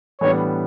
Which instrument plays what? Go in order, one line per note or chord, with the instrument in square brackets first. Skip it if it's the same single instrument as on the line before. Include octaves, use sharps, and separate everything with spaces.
[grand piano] A2 E3 G3 B3 D4 [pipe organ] C#5